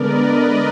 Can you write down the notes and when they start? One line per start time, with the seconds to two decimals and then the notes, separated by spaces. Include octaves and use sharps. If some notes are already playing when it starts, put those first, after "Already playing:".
Already playing: D3 G#3 B3 A#4 B4 D5 D#5